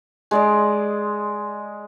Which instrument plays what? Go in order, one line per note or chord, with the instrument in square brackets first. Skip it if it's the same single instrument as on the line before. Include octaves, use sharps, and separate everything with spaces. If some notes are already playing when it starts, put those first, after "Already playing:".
[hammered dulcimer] G#3 D5 D#5